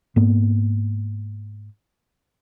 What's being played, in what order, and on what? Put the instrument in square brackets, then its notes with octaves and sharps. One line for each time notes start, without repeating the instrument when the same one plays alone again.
[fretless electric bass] G#2 A#3 B3